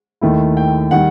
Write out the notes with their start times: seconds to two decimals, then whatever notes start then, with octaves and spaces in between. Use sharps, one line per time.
0.21 D#2 D#3 A3 E4
0.57 G5
0.91 D#3 G3 F#5